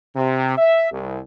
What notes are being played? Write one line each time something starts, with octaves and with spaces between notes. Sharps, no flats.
C3
E5
C2